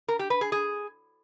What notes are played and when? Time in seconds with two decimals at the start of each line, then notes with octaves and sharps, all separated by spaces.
0.08 A#4
0.19 G4
0.30 B4
0.41 G#4
0.52 G#4